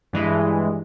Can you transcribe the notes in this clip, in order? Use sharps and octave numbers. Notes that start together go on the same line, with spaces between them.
G2 E3 G#3